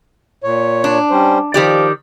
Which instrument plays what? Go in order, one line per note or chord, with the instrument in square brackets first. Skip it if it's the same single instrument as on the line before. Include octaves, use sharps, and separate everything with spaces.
[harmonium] A#2 C#5
[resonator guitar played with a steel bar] D4
[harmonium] G3 C#4 C5
[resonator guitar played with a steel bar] D#3 G4 D5 [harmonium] F3